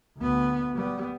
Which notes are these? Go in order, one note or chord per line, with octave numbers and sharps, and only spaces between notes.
D2 B3
G3 B3